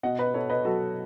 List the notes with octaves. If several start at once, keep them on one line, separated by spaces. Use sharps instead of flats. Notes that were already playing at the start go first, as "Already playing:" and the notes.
B2 D#5 F#5
B4 D#5
B2 A4 C#5
B4 D#5
F#3 F#4 A4